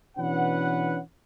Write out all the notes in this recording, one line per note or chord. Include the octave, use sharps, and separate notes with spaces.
B2 E3 C#4 D4 B4 F#5